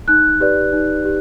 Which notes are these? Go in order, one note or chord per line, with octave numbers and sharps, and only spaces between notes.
D#4 F#6
G4 B4 D5
D#4
G4